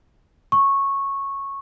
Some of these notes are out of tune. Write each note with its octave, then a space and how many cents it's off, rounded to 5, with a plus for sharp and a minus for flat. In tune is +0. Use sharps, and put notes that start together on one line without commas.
C#6 -10